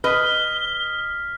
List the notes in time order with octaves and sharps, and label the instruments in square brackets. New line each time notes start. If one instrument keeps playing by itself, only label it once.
[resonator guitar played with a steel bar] B4 [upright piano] D#5 [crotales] F6 B6 [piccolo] G7